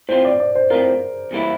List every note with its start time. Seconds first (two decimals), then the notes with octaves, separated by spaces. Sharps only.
0.09 A2 F3 C4 F4 C5
0.25 D5
0.40 D5
0.55 C5
0.70 A2 F3 C4 F4 A#4
1.31 E2 E3 G3 A#3 E4